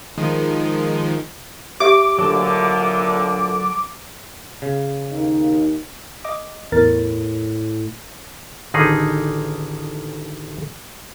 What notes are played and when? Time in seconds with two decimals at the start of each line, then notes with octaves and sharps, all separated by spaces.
0.18 D#3 F3 G#3
1.80 G4 C#5 E5 D6
2.19 D2 A#2 D3 F#3 A5
4.62 C#3
5.11 D#2 D#4
6.24 D#5 D6
6.72 E2 A2 A#4 A6
8.74 A1 D3 D#3 D#4 G#4